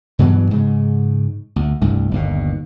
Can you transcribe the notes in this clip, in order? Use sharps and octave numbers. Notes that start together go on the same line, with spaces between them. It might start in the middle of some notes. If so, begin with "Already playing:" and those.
G2 B2 E3 F#3
G#2 C#3
D2
C2 G2 A3
G1 D#2 B2